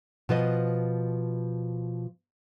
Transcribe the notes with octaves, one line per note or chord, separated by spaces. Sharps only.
B2 F3 B4 D#5